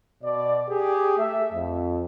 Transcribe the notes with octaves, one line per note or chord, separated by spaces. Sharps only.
B2 D5
G4 G#4
A3 E5
F2